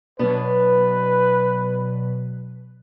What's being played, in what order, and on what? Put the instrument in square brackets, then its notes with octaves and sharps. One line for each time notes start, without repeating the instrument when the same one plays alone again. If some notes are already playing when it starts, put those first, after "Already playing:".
[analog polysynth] B2 F#3 [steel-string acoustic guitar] B3 D4 [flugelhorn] B4